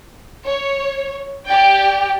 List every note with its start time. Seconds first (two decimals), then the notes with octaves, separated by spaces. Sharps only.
0.47 C#5
1.47 G4 D5 G5